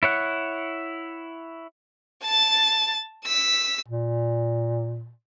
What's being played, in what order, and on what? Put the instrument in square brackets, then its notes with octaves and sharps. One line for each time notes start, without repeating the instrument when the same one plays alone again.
[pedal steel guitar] E4 C#5 F#5
[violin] A5 A6
E6 B6
[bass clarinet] A#2